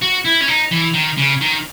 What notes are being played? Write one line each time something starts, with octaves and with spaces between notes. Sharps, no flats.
F#4
E4
C#4
D#4
E3
D#3
C#3
D#3